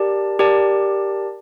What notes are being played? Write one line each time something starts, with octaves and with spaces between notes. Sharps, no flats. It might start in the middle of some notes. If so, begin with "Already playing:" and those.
Already playing: G4 A#4 D5 A5
G4 A#4 D5 A5